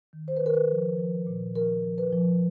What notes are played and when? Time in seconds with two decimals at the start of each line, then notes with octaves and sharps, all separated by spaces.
0.13 D#3
0.28 C5
0.37 B4
0.41 D#3 A#4
0.54 B4
0.71 F3
0.98 F3
1.27 A#2
1.56 F3 A#4
1.84 F3
1.98 B4
2.12 F3